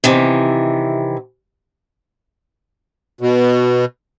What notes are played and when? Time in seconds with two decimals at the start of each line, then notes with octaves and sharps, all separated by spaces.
0.04 C3 D#3 E3
3.21 B2